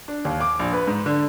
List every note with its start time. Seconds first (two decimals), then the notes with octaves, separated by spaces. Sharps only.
0.08 D4
0.25 D#2
0.41 D6
0.59 A#1
0.73 B4
0.87 G#2
1.06 D3